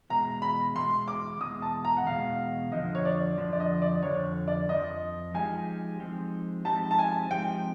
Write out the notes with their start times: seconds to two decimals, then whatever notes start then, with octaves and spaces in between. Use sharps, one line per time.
0.10 E2 B2 G#3 A#5
0.42 B5
0.75 E2 B2 G#3 C6
1.08 D6
1.41 E2 B2 G#3 D#6
1.62 A5
1.85 A#5
1.97 F#5
2.07 E2 B2 G#3 F5
2.72 F2 D3 F3 D#5
2.95 C#5
3.05 D5
3.38 F2 D3 F3
3.53 D5
3.60 D#5
3.82 D5
4.03 F2 D3 F3 C#5
4.48 D5
4.69 F2 D3 F3 D#5
5.34 F3 G#3 C4 D#4 G4 G#5
6.00 F3 G#3 C4 D#4 G4
6.65 F3 G#3 C4 D#4 G4 A5
6.91 A5
6.99 G#5
7.31 F3 G#3 C4 D#4 G4 G5